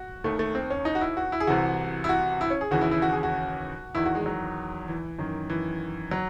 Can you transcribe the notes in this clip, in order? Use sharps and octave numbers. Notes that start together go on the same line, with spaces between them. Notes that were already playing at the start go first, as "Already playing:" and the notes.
Already playing: F#4
D#2 D#3 A3
A3
C4
C#4
D#4
F#4
E4
F#4
E4
G#4
C2 C3 E3 F#4
E4
F#4
E4
C#4
G#4
D#2 C#3 E3 F#4
E4
E4
F#4
G#4
F#4
E2 D#3 E4
F#4
G#3
F#3
E3
F#2 D#3
E3
F#3